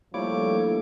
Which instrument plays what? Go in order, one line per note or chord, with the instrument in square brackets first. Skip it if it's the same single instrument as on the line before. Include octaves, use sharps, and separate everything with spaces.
[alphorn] F3 [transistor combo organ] G3 C#5 D6 [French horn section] A3 D4 [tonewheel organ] A#3 E4